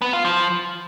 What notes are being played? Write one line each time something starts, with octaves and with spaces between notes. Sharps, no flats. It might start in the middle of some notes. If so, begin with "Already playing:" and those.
B3
F4
F3